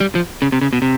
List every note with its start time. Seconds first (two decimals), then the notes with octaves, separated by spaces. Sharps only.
0.01 G3
0.15 F3
0.42 C#3
0.52 C3
0.61 C#3
0.73 B2
0.82 C3